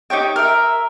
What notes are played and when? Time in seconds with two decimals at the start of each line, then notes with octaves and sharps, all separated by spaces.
0.10 D#4 G4 C#5 G5
0.36 A#4 E5